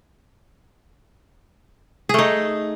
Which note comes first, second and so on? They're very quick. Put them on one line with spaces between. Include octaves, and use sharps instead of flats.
G#4 A3 D#4